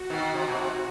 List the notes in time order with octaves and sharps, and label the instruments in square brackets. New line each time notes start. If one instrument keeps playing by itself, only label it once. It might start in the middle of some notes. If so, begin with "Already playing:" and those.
Already playing: [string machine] F#4
[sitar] B2 D#3
C3
B2
C3